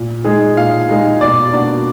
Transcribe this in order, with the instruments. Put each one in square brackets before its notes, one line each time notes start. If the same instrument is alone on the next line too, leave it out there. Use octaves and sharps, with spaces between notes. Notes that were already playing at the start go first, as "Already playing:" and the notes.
Already playing: [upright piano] A#2
G#3 D#4 G#4
[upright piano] A#2 [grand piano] F5
[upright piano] G#3 D#4 G#4
[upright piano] B2 [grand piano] D5
[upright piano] A#3 D4 F#4